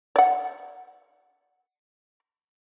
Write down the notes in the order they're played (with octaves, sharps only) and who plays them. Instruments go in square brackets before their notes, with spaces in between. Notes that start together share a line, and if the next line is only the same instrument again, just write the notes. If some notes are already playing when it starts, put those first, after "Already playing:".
[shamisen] D5 F#5